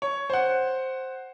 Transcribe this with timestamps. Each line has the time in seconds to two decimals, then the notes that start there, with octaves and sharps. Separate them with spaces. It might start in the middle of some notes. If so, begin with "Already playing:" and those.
0.02 C#5
0.30 C5 F#5